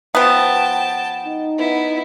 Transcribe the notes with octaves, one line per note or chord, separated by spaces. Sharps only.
F3 B3 G5 A5
D#4
B3 E4